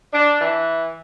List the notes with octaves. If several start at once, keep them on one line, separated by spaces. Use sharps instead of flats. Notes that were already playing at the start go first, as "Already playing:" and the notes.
D4
E3